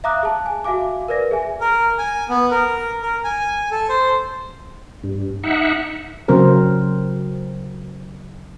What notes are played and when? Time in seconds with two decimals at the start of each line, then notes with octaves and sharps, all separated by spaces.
0.04 E5 F5 A#5 D6 D#6 F#6
0.23 G#4 A5
0.46 G#5
0.64 F#4 E5 F5 G#5 D6
1.08 A#4 B4 D5 A#6
1.31 G#4 E5 G#5
1.61 A#4
1.99 G#5
2.29 B3
2.51 A#4
3.03 A#4
3.24 G#5
3.71 A4
3.89 C5
5.04 G2
5.44 D#4 E5 F#5
6.28 C#3 F#3 C4 A#4 C5